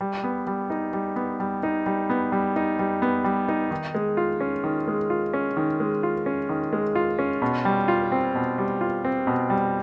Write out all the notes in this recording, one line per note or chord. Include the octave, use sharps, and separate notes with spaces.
G3
B3
G3
D#4
G3
B3
G3
D#4
G3
B3
G3
D#4
G3
B3
G3
D#4
D#3
G#3
F4
C#4
D#3
G#3
F4
C#4
D#3
G#3
F4
C#4
D#3
G#3
F4
C#4
B2
G3
F4
C4
B2
G3
F4
C4
B2
G3